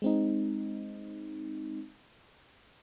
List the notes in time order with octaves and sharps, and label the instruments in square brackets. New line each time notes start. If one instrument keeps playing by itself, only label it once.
[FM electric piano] G#3 C4 D#4